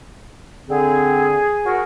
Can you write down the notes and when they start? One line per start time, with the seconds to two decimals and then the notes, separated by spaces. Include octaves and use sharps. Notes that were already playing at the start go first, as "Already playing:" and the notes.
0.69 D3 C4 G#4
1.66 F#4 A#4